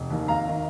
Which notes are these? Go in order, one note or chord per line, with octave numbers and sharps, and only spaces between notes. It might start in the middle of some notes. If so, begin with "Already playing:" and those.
Already playing: F1
D#2 D#3
G#1 F5 A#5
D#3